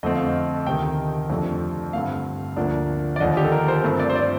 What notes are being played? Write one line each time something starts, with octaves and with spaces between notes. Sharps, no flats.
F2 D3 A3 C4 D#5
F5
D#5
D2 C3 D#3 G5
G5
F2 C3 F3 A3 D4
G2 D3 A3 C4 F5
D2 D3 F3 A#3 D4
D5
D#2 D3 F3 D#5
G4
A4
A#4
C5
G2 F3 A3 C4
D5
C5
D5